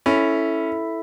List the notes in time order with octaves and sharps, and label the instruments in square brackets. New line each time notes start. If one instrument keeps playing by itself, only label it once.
[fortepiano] C#4 [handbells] E4 A4 E5